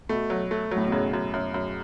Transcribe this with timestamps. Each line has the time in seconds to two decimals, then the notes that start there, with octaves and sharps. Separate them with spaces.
0.09 B2 A3
0.30 F#3
0.51 A3
0.71 A2 F#3
0.84 B2
0.91 F#2 C#3
1.13 F#2
1.34 F#2
1.54 F#2